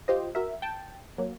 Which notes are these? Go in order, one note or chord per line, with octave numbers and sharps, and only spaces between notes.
F4 G4 C5 D#5
F#4 A#4 E5
G5 A5
F#3 A#3